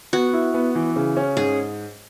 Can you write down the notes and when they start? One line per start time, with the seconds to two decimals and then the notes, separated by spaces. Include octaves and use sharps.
0.13 B3 F#4
0.33 E4
0.54 B3
0.75 E3
0.96 C#3
1.17 C#4
1.36 G#2 G#4